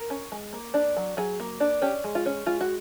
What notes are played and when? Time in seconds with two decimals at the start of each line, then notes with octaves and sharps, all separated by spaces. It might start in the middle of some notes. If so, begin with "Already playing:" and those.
Already playing: A#4
0.10 C#4
0.32 G#3
0.53 A#3
0.74 D4
0.97 F#3
1.17 F#3 G#4
1.40 A#3
1.60 D4
1.82 C#4 G4
2.04 G#3
2.15 F4
2.26 C#4
2.46 G#3 F4
2.61 F#4